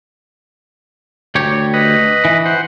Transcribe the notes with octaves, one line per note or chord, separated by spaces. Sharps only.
D2 G4 C#5
B4 D#5
E3
C5 F#5